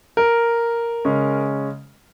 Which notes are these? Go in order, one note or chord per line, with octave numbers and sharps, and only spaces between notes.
A#4
C#3 G#3 C#4